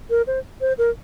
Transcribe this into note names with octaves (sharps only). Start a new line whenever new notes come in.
A#4
C5
C5
A#4